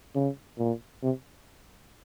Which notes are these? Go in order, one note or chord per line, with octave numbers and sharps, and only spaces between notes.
C#3
A#2
C3